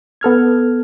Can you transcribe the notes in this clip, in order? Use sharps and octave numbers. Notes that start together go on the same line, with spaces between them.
B3 A4 F6 G#6